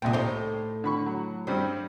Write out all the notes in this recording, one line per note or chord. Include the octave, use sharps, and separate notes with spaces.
C2 A#2 C#3 G5
A2 D#4 G4 C5
D3 B5 C#6
F#3
G2 F#3 G3 C4